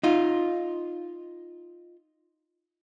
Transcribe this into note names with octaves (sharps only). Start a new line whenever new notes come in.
D#4 F4